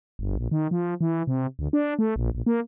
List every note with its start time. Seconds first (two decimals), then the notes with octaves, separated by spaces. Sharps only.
0.19 G1
0.37 A#1
0.51 D#3
0.71 F3
1.01 E3
1.27 C3
1.59 D2
1.73 D4
1.99 A3
2.16 A#1
2.35 A#1
2.46 A#3